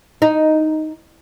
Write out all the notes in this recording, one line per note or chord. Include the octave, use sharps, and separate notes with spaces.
D#4